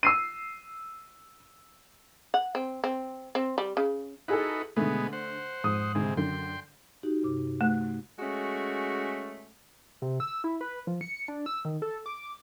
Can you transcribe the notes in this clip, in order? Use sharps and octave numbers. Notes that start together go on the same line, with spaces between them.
E6 C7 D#7
F#5
C4
C4
C4
G3
C#3
D#4 E4 F#4 G#4 A4 B4
B2 D3 G#3 A3 B3
C5 F#5
F2 G#2 D#6
D2 C3 G#3
F#2 D3 G5 C6
D#4 F#4 G4
G2 C3 D6
A3 F#6
G#3 A3 C#4 F#4
C3
E6
E4
B4
F3
C#7
D4
E6
D#3
A4
D6